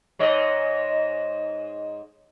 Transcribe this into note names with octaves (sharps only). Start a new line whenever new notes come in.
G#2 C#5 D#5